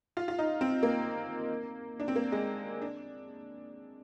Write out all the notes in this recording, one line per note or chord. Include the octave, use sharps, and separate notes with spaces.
F4
F4
D#4
C4
A#3
D4
C4
A#3
G#3
D4